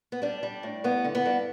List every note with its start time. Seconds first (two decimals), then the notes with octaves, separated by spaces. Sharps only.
0.12 B3
0.22 G3 D4
0.43 G3
0.63 A2
0.84 G2 B3
1.05 D3
1.15 B3
1.26 G2